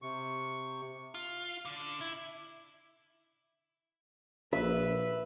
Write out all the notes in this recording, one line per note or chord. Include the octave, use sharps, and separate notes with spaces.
C3 C#6
F4
D3
E4
A#1 B4 E5